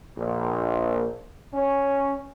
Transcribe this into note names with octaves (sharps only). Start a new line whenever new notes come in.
A#1
C#4